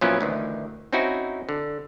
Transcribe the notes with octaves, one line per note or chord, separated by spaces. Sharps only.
A#2 F3 F#3 B3 C#4 E4
D2 D#3 E3
C4 C#4 D#4 E4 F#4
D3